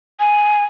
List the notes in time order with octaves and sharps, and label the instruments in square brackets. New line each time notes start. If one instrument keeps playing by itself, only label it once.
[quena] G#5